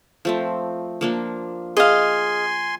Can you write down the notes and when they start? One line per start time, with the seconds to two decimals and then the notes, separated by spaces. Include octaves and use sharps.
0.25 F3 A3 C4
1.01 F3 A#3 D4
1.77 G#4 D#5 F5 G#5 C6